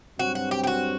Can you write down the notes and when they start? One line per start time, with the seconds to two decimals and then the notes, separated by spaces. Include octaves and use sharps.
0.19 G2 F#3 C4 F#4
0.35 F#4
0.51 G4
0.63 G4
0.67 F#4